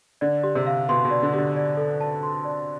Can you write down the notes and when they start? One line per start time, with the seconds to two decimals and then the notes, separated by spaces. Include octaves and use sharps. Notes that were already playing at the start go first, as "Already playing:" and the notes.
0.21 D3 D5
0.44 G4
0.55 C3
0.67 F5
0.89 B2 C6
1.05 B2
1.11 D5
1.23 D3
1.34 D3 G4
1.56 D5
1.77 A4
2.01 A5
2.23 C6
2.45 D5